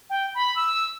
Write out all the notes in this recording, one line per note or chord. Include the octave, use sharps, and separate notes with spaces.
G5
B5
E6